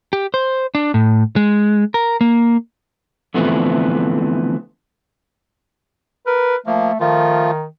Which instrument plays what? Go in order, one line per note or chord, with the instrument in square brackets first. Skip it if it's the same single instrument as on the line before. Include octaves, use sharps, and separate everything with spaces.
[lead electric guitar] G4
C5
D4
A2
G#3
A#4
A#3
[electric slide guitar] D3 E3 F3 A3 B3 C4
[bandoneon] A#4 [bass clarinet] B4
[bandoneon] F3 A#3 [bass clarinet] A3
[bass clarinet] D#3 [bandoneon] F3 A3 F4